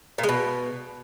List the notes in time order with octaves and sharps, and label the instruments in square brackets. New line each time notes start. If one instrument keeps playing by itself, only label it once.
[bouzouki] A#2
G#3
B2